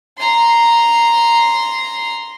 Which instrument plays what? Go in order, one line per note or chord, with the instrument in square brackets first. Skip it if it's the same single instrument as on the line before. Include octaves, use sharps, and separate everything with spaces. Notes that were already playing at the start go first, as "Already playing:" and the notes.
[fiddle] A#5 C6